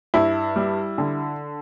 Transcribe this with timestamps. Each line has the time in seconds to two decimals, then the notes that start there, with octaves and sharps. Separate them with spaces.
0.14 G2 E4
0.56 G3
0.98 D3